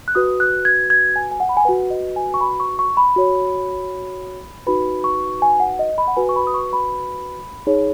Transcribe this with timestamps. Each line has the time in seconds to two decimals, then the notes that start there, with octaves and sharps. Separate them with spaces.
0.08 F#6
0.15 F#4 B4 D#6
0.40 F#6
0.65 G#6
0.90 G#6
1.16 G#5
1.31 G#5
1.40 F#5
1.49 B5
1.57 G#5
1.65 F#4 B4 F#5
1.90 D#5
2.16 G#5
2.34 C#6
2.41 B5
2.60 C#6
2.79 C#6
2.97 B5
3.16 F#4 C#5
4.67 D#4 F#4 B4 B5
5.04 C#6
5.42 G#5
5.60 F#5
5.79 D#5
5.98 B5
6.08 F#5
6.16 F#4 B4 G#5
6.29 C#6
6.36 B5
6.47 D#6
6.54 C#6
6.73 B5
7.67 D#4 G#4 C#5